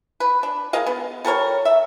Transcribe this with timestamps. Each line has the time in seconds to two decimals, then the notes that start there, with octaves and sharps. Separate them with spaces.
0.20 B4
0.43 D4
0.73 G#3 A#4 D#5 F5
0.86 B3
1.25 G3 A4 A#4 C#5
1.65 E5